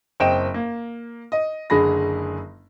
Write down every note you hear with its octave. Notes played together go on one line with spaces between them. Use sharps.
F#1 C4 D#5 G5 D7 E7
A#3
D#5
F#1 D3 G#3 G#4 B5 A#6